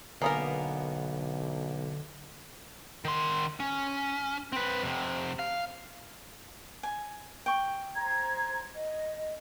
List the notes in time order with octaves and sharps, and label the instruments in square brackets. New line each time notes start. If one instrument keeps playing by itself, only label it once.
[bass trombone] B1 [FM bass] D3 [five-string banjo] A#3 B3 A#4 [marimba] G#5 A#5 D#6
[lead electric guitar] D#3 C6
C#4
C4 B4
F2 C3
F5
[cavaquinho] G#5
G5 C#6
[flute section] C5 A#5 G#6
D#5